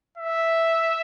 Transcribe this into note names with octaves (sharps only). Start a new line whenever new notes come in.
E5